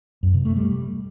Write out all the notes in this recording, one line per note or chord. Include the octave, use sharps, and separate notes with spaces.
F#2
C3
A3
G3